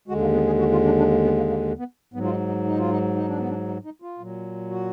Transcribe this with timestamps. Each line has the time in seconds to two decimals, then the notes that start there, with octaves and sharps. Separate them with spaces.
0.08 D#2 D3 G#3 F#4
0.21 A#3
0.34 B3
0.47 G#4
0.59 F#4
0.72 F4
0.85 D4
0.98 D4
1.11 A#3
1.24 B3
1.37 A#3
1.50 A#3
1.79 B3
2.14 G#2 F#3 B3
2.25 F4
2.30 D#4
2.48 D#4
2.65 D#4
2.78 F4
2.91 D#4
3.16 D#4
3.28 D4
3.38 B3
3.49 D4
3.68 D#4
3.85 D#4
4.02 F4
4.19 A#2 F#3
4.71 F#4